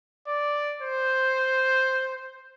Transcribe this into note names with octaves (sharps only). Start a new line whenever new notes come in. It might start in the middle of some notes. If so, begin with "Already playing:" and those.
D5
C5